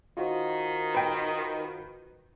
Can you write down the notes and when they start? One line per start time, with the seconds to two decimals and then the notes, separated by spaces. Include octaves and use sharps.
0.17 D#3 F4 F#4 C5
0.95 B4 G5